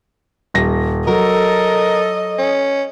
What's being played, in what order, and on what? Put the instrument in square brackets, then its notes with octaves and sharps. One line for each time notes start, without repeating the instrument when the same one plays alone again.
[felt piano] D#1 A#6
[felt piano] F#3 [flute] A4 [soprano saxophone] A#4 [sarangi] D#5
[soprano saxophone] C#4